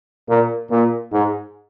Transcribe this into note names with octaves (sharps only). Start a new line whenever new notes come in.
A#2
A#2
G#2